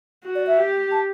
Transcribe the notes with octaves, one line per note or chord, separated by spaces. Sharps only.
F#4
D5
E5
G4
A5